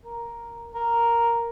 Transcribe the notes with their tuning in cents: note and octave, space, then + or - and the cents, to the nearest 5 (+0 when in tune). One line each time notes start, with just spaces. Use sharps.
A#4 +5
A#4 +0